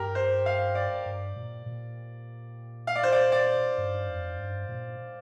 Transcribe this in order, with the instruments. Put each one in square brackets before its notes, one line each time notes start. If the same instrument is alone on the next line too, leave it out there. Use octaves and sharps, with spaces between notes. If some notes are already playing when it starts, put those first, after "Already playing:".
Already playing: [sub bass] G2 [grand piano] G4 A#4
[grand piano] C5
F5
D5
[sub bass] G2
A#2
A#2
[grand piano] F5
D5
C5
D5
D5
[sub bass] G2
F2
G2
A#2